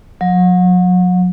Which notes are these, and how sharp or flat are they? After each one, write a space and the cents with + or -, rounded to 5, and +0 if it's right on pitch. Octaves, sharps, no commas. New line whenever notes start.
F#3 -35